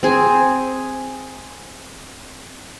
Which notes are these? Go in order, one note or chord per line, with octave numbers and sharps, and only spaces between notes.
C4 G#4